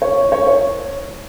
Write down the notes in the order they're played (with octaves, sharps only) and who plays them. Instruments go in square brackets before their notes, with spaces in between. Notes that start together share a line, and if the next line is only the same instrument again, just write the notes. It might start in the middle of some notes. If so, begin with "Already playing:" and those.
[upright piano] C#5
C#5
C#5